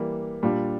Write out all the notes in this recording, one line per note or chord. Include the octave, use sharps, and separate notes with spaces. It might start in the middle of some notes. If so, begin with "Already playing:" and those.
Already playing: E3 G3 A#3
A#2 G3 D4 F4